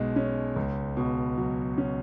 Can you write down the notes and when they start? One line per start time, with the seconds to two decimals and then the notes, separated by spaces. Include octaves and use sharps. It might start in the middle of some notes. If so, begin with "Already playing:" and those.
Already playing: B1 B2 G#3
0.16 C#4
0.56 C#2
0.97 B2
1.38 F#3
1.78 C#4